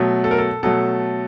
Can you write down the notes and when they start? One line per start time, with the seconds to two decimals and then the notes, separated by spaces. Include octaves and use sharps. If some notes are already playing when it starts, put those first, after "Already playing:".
Already playing: B2 F#3 A3
0.24 A4
0.31 A#4
0.38 A4
0.63 B2 F#3 A3 A4